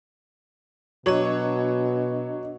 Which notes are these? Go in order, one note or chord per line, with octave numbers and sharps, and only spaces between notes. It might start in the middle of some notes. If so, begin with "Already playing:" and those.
B2 F#3 D4 C#5 D#5